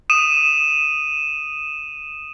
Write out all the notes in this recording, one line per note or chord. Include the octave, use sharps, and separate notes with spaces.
D#6 D#7 E7